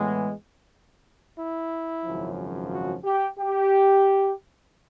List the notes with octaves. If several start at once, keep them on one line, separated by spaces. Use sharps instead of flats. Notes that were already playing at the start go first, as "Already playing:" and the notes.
Already playing: A2 E3 G#3 B3
E4
G#1 F#2 C#3 F3
F#4
G4
G4